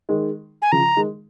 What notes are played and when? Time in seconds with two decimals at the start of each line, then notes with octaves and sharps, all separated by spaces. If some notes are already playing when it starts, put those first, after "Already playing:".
0.09 D#3 G#3
0.62 G#5
0.72 C#3 F3 A#5
0.96 D#3 G#3